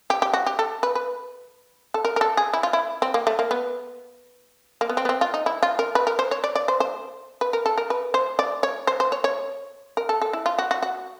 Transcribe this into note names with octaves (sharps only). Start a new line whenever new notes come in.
G4
G4
F#4
G4
A4
B4
B4
A4
A#4
A#4
A4
G#4
E4
F4
E4
C4
A#3
A3
A#3
B3
A#3
B3
C4
B3
C4
F4
D#4
E4
F4
A#4
B4
A#4
C5
C#5
D5
D5
C5
C5
B4
A#4
A4
A#4
B4
C5
D5
C#5
C5
C5
C#5
C#5
A#4
A4
A4
E4
F4
F#4
F#4
F#4